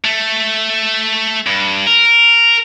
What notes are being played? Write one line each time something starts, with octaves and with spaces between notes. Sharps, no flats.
A3
G2
A#4